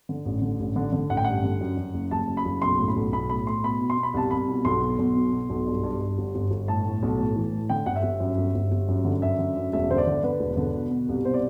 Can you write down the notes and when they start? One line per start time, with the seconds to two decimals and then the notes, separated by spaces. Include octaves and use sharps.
0.09 D3
0.25 A1
0.42 D3
0.60 A1
0.76 D3
0.93 D3
1.10 A1 F#5
1.17 G5
1.24 G2 F#5
1.44 D3
1.61 F#2
1.77 F#2
1.94 F#1
2.11 F#1 A5
2.28 F#2
2.37 B5
2.45 F#1
2.62 B1 C6
2.79 A2
2.88 B5
2.96 B1
3.12 B1 B5
3.30 A2 B5
3.47 A2 C6
3.63 B2 B5
3.80 B2
3.90 C6
3.98 B2
4.03 B5
4.14 C2 A5
4.31 C2 B5
4.48 B2
4.65 B1 C6
4.82 B2
4.99 B1
5.16 B2
5.32 B2
5.50 B1
5.67 G2
5.83 G2
6.01 G2
6.18 G1
6.35 G1
6.51 G1
6.68 A2 A5
6.85 A2
7.03 B1
7.18 A2
7.36 E3
7.52 A2
7.69 D3 G5
7.86 G1 F#5
7.96 E5
8.03 G1
8.20 F#2
8.38 G1
8.55 G1
8.72 G1
8.88 F#2
9.05 D3
9.22 F#2 E5
9.38 D3
9.57 F#2
9.73 E1 E5
9.90 D3 C5
9.98 D5
10.07 D3
10.24 D3 B4
10.40 E1
10.57 D3
10.75 B2
10.91 B2
11.09 C2
11.25 B2 C5
11.34 D5